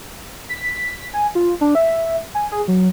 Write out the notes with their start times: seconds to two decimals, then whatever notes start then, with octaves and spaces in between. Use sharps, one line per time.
0.49 B6
1.14 G#5
1.35 F4
1.61 D4
1.75 E5
2.35 G#5
2.52 G#4
2.68 F#3